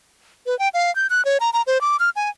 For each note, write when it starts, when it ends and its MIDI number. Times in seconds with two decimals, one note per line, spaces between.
0.46 0.58 71
0.59 0.69 79
0.74 0.94 77
0.96 1.07 91
1.10 1.25 90
1.25 1.38 73
1.40 1.50 82
1.53 1.62 82
1.67 1.81 72
1.81 1.97 86
2.00 2.10 89
2.16 2.30 80